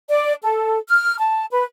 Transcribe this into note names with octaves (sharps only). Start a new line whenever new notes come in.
D5
A4
F6
A5
B4